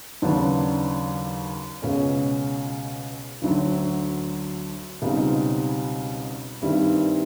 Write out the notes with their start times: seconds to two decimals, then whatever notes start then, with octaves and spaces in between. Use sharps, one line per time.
0.22 D#2 C#3 F#3 B3 D4
1.82 C#2 B2 G#3 C#4
3.42 D2 D3 F#3
5.02 C#2 B2 G3 C4 D#4
6.62 G2 D#3 G3 C4 E4